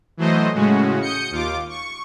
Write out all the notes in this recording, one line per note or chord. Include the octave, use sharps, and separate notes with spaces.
E3 F#3 A3 C5 D#5
A2 C#3 G#3 C#4 F#4
D#6 G6 C#7
D#2 F4 D6
C#6